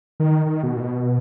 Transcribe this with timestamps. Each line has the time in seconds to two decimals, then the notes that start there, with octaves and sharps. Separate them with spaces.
0.20 D#3
0.46 D#3
0.63 B2
0.76 A#2
0.80 B2